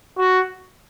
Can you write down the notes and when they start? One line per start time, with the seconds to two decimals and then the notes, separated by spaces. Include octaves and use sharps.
0.18 F#4